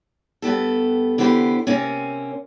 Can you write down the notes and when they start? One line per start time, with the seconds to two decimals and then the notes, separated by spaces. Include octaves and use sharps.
0.42 G2 B3 G4 A4
1.18 D3 E3 B3 G4 C5
1.67 C3 A#3 C4 C#4